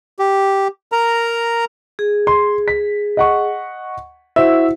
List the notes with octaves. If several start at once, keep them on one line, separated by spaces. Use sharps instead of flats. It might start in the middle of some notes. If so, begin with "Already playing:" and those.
G4
A#4 A#5
G#4
C6
B6
D#5 F#5 C#6
E4 F#4 C5 E5